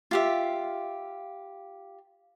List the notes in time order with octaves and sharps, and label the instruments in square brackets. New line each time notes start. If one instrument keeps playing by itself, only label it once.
[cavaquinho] F4 G4 E5